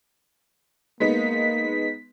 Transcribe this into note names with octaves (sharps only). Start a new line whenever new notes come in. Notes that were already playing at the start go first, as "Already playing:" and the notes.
G#3 A#3 B3 D#4 B6